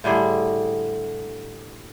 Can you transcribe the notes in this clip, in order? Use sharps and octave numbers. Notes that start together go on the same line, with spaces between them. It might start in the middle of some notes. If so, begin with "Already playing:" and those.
A2 D3 G3 G#4